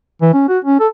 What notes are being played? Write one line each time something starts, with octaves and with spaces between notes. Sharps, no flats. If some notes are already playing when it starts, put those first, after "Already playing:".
E3
C#4
F#4
C#4
A4